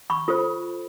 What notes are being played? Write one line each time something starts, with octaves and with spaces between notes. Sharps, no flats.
B5 C#6
F4 A4 C5